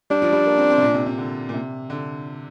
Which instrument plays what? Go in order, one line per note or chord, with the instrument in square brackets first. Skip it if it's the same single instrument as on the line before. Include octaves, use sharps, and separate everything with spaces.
[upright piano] G3 [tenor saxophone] D4
[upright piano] F3
G3
A#3
C4
C4
C3
A#2
C3
C3
D3
A#2
C3
D3